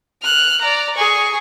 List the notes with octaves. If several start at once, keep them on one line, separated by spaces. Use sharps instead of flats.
F6 F#6
D5 A#5
G#4 C#6